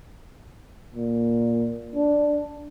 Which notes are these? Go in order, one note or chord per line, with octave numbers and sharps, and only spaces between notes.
A#2
D4